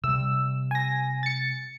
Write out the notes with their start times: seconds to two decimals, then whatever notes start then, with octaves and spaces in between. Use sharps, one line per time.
0.04 C3 G3 E6
0.71 G#5 A#6
1.23 A6 C#7